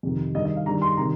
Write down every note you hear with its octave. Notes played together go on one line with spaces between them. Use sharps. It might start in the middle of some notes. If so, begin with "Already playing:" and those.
F2 C3 D#3
G2 D#3 D#5
D#5
F5
G2 D#3 A#5
C6
C3 D#3 A#5